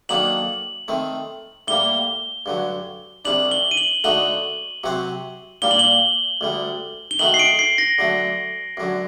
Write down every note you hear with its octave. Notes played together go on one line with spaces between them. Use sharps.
D#3 F#3 A#3 D4 A4 F#7
D#3 A3 C4
A2 G3 A#3 G7
G2 D3 F#3
C2 C3 G3 D4 F#7
G7
D#7
F#7
D3 A3 D#4 F#4 F#7
C3 F#3 C4 F#4 C5
A#2 G3 A#3 G7
F#7
G7
D2 D3 G3
G7
D#3 A3 D#4 F#4 F#7
C7
D7
C7
A#6
D3 F#3 A3
F#2 D3 F#3